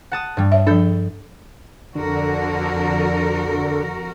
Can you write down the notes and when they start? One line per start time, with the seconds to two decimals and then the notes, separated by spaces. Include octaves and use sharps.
0.12 F#5 A5 D#6
0.37 G2 G3
0.52 C#5 E5
0.67 F3 D4 A4 G6
1.95 F2 D3 F#4 A#4